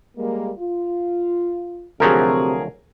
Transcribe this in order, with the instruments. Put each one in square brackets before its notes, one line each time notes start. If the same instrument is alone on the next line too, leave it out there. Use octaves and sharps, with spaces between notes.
[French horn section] G3 G#3 A#3
F4
[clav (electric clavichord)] D2 F3 F#3 [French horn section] C3 [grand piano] G#4 A#4